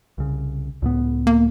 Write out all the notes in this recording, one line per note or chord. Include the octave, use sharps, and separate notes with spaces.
C2 C#3
C#2 A2 B3
A#3